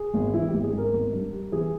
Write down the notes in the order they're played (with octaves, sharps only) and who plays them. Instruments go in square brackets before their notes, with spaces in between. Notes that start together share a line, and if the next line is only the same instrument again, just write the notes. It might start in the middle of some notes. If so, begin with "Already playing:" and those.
Already playing: [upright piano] G#4
G#1
E3 E4
G#1 G4
G#4
G#2 A#4
G#1
G2
G3
E3 G#4